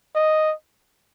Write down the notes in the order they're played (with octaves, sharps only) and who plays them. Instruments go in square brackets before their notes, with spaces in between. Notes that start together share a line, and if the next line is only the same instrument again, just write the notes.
[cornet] D#5